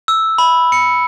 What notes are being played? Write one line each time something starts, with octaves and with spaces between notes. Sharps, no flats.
E6
B5
C#7